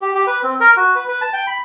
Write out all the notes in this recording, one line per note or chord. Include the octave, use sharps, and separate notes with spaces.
G4
G4
B4
C4
A#4
F#4
B4
B4
A5
G5
B5